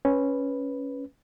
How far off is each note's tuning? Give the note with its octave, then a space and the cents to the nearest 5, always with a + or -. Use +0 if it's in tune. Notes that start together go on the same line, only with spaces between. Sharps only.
C#4 +0 B4 -5